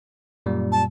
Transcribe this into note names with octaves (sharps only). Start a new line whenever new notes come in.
F#2 A#2 G3
A5